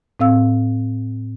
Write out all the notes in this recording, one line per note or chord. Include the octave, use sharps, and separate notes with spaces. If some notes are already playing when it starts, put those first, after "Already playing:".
A2 C4 F5 E6